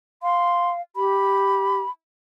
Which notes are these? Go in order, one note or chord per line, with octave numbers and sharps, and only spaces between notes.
F5 C6
G4 B5